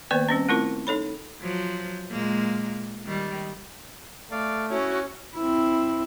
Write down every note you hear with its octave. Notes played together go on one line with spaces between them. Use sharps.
D#3 A#3 B3 B4 C5 D5
G3 C4 C#4
A3 C4 E4 F4 A#4
D#4 A4 C#5 B5
F3 F#3
A#2 G#3 A#3
D#3 G3
A3 D5 F5
C#4 E4 F#4
C4 E4